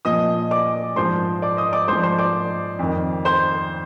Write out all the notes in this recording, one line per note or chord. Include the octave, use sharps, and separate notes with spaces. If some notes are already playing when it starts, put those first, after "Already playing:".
A#2 F3 D#5 D#6
D5 D6
G#2 F3 C5 C6
D5 D6
D#5 D#6
D5 D6
G#2 F3 C5 C6
C5 C6
D5 D6
F2 D#3
C5 C6